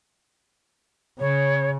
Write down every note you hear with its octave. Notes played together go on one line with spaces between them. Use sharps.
C#3 C#5